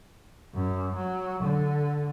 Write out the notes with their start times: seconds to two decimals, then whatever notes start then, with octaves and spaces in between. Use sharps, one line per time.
0.55 F#2
0.95 F#3
1.43 D3